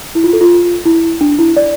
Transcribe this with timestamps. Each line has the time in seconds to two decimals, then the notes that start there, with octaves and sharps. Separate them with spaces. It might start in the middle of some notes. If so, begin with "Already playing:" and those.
0.15 E4
0.24 F4
0.33 A4
0.41 F4
0.85 E4
1.21 D4
1.38 E4
1.56 D5